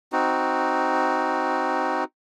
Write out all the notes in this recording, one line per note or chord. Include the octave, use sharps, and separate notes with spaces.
C4 D#4 F#4